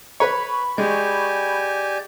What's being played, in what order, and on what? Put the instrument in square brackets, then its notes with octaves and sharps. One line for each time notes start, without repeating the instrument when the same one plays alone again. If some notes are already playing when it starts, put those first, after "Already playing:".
[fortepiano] B4 C#5 [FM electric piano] B5 C#6
[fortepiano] G#3 [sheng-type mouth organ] G4 G#5 [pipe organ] D5 G6